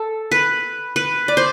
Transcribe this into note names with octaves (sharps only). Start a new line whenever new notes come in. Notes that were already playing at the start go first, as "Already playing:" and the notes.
Already playing: A4
B4
B4
D5
C5